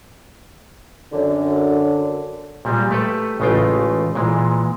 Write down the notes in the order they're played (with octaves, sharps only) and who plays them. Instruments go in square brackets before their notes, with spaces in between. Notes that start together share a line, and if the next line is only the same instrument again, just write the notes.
[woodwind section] F#2 D3
[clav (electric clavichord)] A#2 G3 G#3
A3 G4 A4 B4
A1 C#3 G#3 A3 F4 G5
A#2 E3 G#3